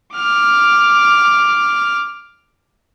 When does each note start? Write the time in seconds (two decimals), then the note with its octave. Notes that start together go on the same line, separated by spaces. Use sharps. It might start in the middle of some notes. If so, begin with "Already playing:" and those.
0.16 D6 F6